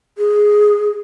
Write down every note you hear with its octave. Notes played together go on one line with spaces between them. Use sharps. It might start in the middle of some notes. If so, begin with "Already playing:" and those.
G#4